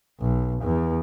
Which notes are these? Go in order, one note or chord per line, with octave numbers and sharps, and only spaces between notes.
B1
E2